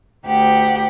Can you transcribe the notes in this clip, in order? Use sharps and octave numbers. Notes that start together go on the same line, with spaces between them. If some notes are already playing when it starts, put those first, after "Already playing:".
D2 G4 F#5